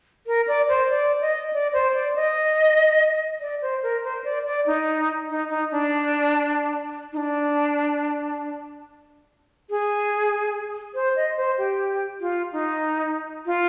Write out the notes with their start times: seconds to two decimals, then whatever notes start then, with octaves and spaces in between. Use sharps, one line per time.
0.27 A#4
0.48 D5
0.69 C5
0.90 D5
1.21 D#5
1.53 D5
1.73 C5
1.94 D5
2.16 D#5
3.41 D5
3.62 C5
3.83 A#4
4.04 C5
4.24 D5
4.46 D5
4.66 D#4
5.30 D#4
5.50 D#4
5.71 D4
7.13 D#4
7.17 D4
9.70 G#4
10.94 C5
11.16 D#5
11.37 C5
11.58 G4
12.20 F4
12.52 D#4
13.46 F4